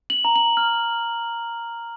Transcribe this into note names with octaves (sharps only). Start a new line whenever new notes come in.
F#7
A#5
F#7
F6